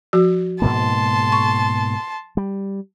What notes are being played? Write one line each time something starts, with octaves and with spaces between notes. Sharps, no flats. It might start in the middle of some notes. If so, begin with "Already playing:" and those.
F3 F#4
G#2 B2 A#3 A5 C6
C#6
G3